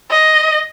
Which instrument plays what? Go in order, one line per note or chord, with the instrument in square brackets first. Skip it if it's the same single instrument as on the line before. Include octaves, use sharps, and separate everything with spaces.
[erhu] D#5